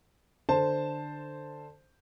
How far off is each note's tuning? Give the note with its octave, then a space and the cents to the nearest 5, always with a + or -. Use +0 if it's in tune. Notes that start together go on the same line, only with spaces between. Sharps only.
D3 +15 C5 +0 A5 +0